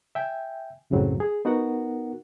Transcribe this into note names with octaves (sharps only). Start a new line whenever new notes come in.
E5 G5 G#5
C2 F#2 A2 C#3 F#3 C4
G#4
B3 D#4 F#4 A#4 F#5